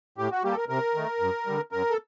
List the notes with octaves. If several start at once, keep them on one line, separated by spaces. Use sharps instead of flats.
A2 G4
F#4
G3 A#3 G4
A4
A#4
C3 A#4
D#3 A3
F#2
D3 G3
F#2 A#4
A4